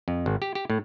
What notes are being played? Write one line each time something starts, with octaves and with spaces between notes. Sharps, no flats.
F2
G#1
G4
G4
A2